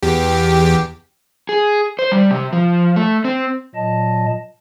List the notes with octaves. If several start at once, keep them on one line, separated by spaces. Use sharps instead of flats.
E2 G4
G#4
C5
G3
C3
F3
A3
C4
A#2 F#3 D#5 A5